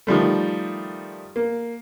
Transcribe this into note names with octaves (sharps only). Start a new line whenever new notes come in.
D#3 F3 G3 A3
A#3